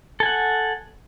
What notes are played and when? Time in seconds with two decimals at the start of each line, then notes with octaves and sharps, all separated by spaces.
0.20 A4
0.23 G#5
0.25 F#5